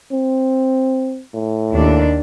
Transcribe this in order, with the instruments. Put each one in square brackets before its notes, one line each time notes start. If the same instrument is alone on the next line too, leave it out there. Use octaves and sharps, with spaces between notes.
[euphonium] C4
A2
[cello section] D#2 D4